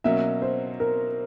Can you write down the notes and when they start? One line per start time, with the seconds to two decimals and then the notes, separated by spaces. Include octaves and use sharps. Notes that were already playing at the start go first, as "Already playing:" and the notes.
0.04 B2 F#3 A#3 C#4 E5
0.42 C5
0.80 A#4